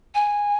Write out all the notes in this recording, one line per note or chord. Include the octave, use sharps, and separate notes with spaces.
G#5